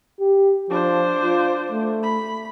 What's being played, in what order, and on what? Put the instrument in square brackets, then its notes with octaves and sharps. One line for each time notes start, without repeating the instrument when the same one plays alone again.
[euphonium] G4
[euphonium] F3 [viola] D4 C5
[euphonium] F4
A3
[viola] B5